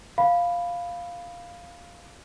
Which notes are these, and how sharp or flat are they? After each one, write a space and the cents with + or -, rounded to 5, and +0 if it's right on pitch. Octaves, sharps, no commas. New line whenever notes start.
F5 +0 B5 +0